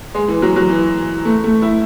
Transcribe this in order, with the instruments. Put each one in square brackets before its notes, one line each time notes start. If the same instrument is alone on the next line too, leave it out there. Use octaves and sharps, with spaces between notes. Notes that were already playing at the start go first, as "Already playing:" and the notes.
[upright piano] G#3
E3
F#3
F#3
E3
A3
A3
E4